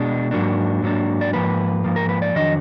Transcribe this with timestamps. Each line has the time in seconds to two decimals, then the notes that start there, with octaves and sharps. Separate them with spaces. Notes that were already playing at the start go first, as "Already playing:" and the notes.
Already playing: B2 G#3 D4
0.31 G#2 F#3 A#3 D4
0.83 G#2 F#3 A#3 D4
1.21 D5
1.33 G#2 F3 A#3 B4
1.84 G#2 F3 A#3
1.96 A#4
2.09 B4
2.22 D5
2.34 F2 D#3 F#3 D4 D#5